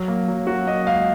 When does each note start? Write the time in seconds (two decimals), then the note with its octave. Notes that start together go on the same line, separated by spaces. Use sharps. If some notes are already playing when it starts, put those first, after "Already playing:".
Already playing: F#3
0.08 A#3
0.28 F#3
0.47 F#3 F#4
0.67 A#3 D#5
0.87 C#2 F5